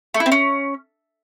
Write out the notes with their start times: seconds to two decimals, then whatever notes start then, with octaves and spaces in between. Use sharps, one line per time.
0.14 A3
0.20 E4
0.26 C4
0.32 C#4